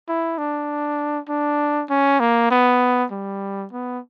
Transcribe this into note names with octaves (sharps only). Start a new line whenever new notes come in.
E4
D4
D4
C#4
A#3
B3
G3
B3